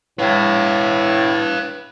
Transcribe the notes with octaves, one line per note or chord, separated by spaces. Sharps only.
A2 B4 F5